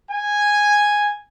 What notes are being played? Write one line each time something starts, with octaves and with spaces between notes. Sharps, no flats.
G#5